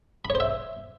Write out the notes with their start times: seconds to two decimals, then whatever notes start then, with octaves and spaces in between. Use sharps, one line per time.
0.25 B5
0.30 C#5
0.35 C5
0.40 E5